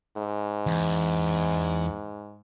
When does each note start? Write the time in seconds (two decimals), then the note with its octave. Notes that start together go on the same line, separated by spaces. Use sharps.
0.17 G#2
0.67 E2